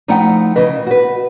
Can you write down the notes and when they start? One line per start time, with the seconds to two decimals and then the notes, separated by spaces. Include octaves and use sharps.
0.08 F3 A3 D#4 E4 F#5 G5
0.56 C#3 E3 B4 D#5
0.87 F#4 B4